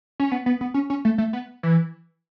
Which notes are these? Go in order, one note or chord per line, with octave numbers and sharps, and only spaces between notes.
C#4
B3
B3
B3
C#4
C#4
A3
A3
B3
E3